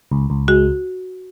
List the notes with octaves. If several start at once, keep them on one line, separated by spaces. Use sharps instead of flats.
C#2
C#2
G#3 F#4